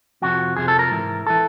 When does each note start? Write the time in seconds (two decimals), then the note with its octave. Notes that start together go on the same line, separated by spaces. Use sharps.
0.22 F2 C3 F3 F#4
0.57 F2 C3 F3 G#4
0.68 A4
0.79 A#4
0.91 G#2 E3
1.27 E3 A4